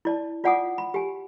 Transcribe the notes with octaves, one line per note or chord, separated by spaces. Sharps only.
E4 D5 A5
F4 D5 F#5 G#5 D6 D#6
B5
G4 G#5